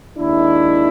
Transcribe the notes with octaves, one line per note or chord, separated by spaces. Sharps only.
D#2 D#3 G#3 D4 E4